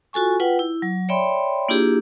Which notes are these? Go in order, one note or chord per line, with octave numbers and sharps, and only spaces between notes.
F4 F#4 A4 G#5 C#6
F4 B4 F#5 G5
E4
F#3
C#5 D5 E5 G5 B5 C6
A#3 D4 E4 F4 G4 G#4